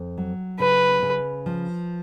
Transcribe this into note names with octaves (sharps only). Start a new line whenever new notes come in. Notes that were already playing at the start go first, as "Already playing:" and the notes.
Already playing: F2
F#3
C#3 B4
C#3
F3